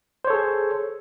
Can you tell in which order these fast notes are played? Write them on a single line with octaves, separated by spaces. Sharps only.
C5 C#5 A4 G#4